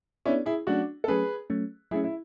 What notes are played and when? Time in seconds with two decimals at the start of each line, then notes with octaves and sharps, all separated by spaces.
0.25 B3 C#4 D4 E4 G#4 D5
0.46 E4 G#4
0.67 F#3 A3 C#4 D4 F#4
1.04 A4
1.08 F#3 A3 C#4 G#4 B4
1.50 F#3 A3 C#4
1.91 F#3 A3 C#4 E4 G#4
2.04 E4